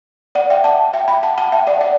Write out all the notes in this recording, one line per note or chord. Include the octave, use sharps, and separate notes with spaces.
D5 F#5
E5 G5
F#5 A5
E5 G5
G5 B5
F#5 A5
F#5 A5
E5 G5
D5 F#5
D5 F#5